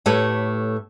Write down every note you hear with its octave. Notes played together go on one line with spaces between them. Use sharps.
A2 A3 G4 B4 C#5